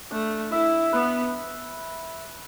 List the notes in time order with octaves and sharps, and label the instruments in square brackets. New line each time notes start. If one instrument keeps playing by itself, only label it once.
[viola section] A3 [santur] D4
[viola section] E4 [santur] E5
[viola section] B3 [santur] B4